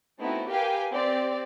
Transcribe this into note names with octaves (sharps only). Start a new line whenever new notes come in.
A3 B3 C4 D#4 E4 F#4
G4 A#4 B4 F5 G5 G#5
C4 G4 D5